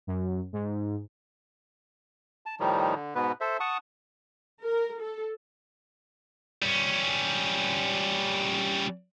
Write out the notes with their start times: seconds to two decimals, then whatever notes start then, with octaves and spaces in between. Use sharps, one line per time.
0.07 F#2
0.53 G#2
2.46 A5
2.60 A2 D#3 F3 G3 D#4
2.94 D3
3.15 G#2 B2 B3 B4
3.41 A4 C5 E5
3.60 F#5 A5 C#6 D#6
4.63 A#4
5.01 A4
6.63 G3 C#4